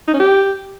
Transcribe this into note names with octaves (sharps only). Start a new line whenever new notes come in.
D#4
C#4
G4